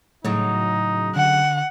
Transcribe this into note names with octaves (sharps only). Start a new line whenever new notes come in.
A2 C#3 F#3 D#4
D3 F#5